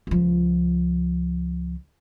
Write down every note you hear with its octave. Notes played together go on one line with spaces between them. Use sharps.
C#2 F3